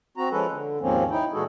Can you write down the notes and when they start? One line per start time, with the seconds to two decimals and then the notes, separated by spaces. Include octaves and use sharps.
0.17 C4 F#4 A#5
0.31 F3 G#3 C#4 A4 B4
0.50 D3
0.81 D#2 G#2 F3 A#3 C4 C#4
1.11 D#4 E4 G5
1.33 A#2 E3 G#3 F#4 G#4 A4